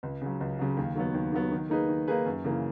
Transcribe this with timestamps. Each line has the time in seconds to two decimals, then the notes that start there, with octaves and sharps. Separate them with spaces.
0.03 C#2
0.22 C#3 F#3
0.41 C#2
0.59 C#3 F#3
0.77 D#2
0.96 D#3 F#3 B3
1.14 D#2
1.32 D#3 F#3 B3
1.51 D#3
1.70 A#3 D#4 G#4 B4
1.89 D#3
2.07 A#3 D#4 G#4 B4
2.26 F#2
2.44 C#3 E3 A#3